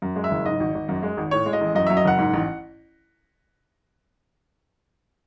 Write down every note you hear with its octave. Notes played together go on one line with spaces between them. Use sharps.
F#2
G#3
E5
F#1
G#2 D#5
G#1
G#1
F#2
G#3
G#1
A2 C#5
G#3
D#5
A1
F#2 D#5
F#3 E5
D#5
F#1 F#5
G#2
A1